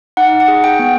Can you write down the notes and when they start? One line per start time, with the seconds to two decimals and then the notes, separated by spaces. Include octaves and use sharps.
0.17 D#4 F#5
0.40 F#5
0.48 G#4
0.64 G5
0.79 B3